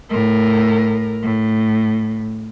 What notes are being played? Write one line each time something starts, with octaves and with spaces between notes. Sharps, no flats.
A2 A#4
A2